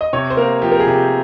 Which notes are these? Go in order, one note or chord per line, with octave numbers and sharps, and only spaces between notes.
D#5
C3 C#5
C5
A#3 A#4
F3 G4
A#4
G#4
C3 G4